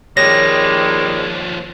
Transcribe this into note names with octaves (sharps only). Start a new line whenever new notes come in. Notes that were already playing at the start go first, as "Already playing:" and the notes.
D#2 D#3 F3 G3 G#3 C#5 A#6